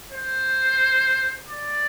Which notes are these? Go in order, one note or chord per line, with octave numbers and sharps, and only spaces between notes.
C5
D5